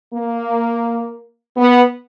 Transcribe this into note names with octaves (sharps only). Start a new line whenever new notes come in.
A#3
B3